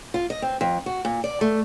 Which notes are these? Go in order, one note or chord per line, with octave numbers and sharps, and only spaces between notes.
F4
D#5
C4
F2
F#4
A#2
D5
A3